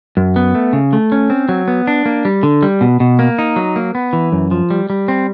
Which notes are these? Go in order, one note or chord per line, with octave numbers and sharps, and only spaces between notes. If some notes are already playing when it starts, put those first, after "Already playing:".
F#2
B3
A3
C#3
A3
C#4
C4
F#3
B3
D4
A#3
G3
D3
G3
B2
B2
A#3
D#4
F#3
A#3
B3
E3
F#2
F3
G3
G3
C4